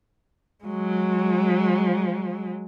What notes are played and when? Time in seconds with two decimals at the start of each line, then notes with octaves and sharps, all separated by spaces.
0.64 F#3 G#3